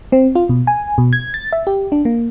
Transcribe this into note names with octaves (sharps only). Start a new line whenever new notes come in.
C4
F4
B2
G#5
B2
G#6
A6
E5
G4
D4
A#3